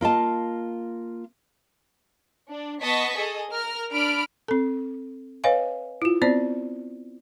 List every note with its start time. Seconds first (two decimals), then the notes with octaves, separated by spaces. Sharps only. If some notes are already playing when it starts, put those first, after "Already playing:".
0.01 A#3 F4 D#5 A5
2.48 D4
2.82 B3 D#5 A5 C#6 B6
3.17 G#4 A4 D#5
3.51 A#4 F6
3.93 D4 B5 F6 D7
4.48 C4 A4
5.44 B4 C#5 D#5 F5 G#5
6.02 E4 F4
6.22 B3 C4 C5 D5